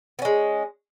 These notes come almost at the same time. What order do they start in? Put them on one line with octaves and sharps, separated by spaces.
B3 C#4 G#3